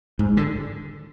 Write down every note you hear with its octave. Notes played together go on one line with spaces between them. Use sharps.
G#2
D3